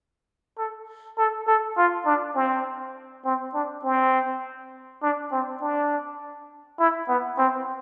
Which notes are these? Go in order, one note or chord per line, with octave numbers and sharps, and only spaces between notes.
A4
A4
A4
F4
D4
C4
C4
D4
C4
D4
C4
D4
E4
B3
C4